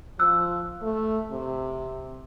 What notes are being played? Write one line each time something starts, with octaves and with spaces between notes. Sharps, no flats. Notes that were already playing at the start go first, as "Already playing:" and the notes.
F3 E6 F#6
A3
C3